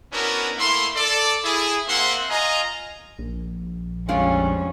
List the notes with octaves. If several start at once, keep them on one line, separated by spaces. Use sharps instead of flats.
B3 C#4 D4 E4 F#4 A#4
A3 A#3 E4 C6
A4 D5
E4 G#4
A#3 C4 E5 F#5 C6
F4 D#5 G#5 A#5
A#1
F2 G3 G#3 C#4 D4 F4